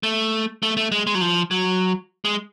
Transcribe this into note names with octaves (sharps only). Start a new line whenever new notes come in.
A3
A3
A3
G#3
G#3
F#3
F3
F#3
G#3